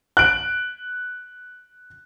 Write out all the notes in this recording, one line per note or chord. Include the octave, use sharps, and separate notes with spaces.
F#6 D7